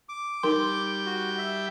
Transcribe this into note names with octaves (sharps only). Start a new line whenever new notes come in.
D6
G3 D#4 A#4 G5 C6
F#4
E5